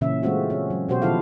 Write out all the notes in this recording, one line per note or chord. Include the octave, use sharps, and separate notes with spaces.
A#2 C#3 E3 C#4 E5
E3 G#3 A3 C4 F4 F#4
C#4
F#3
B2 F#4 G4 C5
D#3 F3 E4 F4 A4 F5